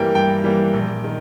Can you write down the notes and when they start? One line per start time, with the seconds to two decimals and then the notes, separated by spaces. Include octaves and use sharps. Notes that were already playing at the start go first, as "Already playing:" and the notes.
Already playing: G2 E3 G3 A#3 A#4 G5
0.15 G2 G5
0.44 E3 G3 A#3
0.74 A#1
1.04 D#3